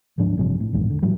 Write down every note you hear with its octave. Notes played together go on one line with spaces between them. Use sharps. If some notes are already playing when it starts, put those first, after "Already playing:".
D1 G#2 F3 D4
A1 G2 C3 F3
A2
A#1 E2 G#2
D3
A2 E3 F#3 G3